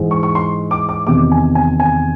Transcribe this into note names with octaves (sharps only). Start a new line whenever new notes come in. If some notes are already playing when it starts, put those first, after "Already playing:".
Already playing: G#2 E3 G#3
C#6
C#6
C6
D6
D6
E2 C3 D#3 D6
G#5
G#5
G#5